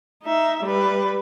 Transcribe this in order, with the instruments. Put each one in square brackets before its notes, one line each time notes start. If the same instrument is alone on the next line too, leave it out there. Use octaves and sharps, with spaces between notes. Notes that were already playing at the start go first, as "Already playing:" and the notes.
[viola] D#4 E5
G3 B4